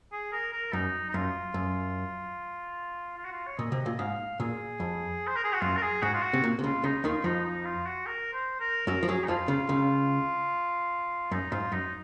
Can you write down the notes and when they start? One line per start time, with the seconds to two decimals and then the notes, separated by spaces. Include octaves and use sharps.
0.12 G#4
0.32 A#4
0.53 A#4
0.73 F#2 D#4
1.09 D#4
1.14 F#2 F4
1.54 F#2
3.17 F4
3.25 F#4
3.32 F4
3.47 C#5
3.58 A#2 D#5
3.72 C3
3.86 A#2
3.99 G#2 F5
4.40 A#2 G#4
4.80 F2
5.27 C5
5.36 A#4
5.44 G#4
5.53 F#4
5.61 F#2 F4
5.77 A#4
5.82 G#4
6.02 G#2 F#4
6.13 F4
6.23 F#4
6.33 C3
6.44 A#2
6.59 C3
6.63 C#2 C#3 F4
6.83 C#2 C#3 D#4
7.04 D#2 D#3 F4
7.24 F2 F3 D#4
7.45 D#4
7.65 F4
7.86 F#4
8.06 A#4
8.33 C5
8.60 A#4
8.87 F#2 F#3 A#4
9.03 F3
9.08 F#2 F#3 G#4
9.24 D#4
9.28 F2 F3 F4
9.48 C#2 C#3 F4
9.69 C#2 C#3
11.31 F#2 D#4
11.51 G#2 F4
11.72 F#2 D#4